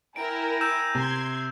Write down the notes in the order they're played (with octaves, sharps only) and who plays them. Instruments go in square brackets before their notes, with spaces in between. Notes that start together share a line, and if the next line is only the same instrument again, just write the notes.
[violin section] E4 A#4 [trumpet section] G5 G#5 A#5 [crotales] D7
[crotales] E6 G6 E7
[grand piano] C3 [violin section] C6 G#6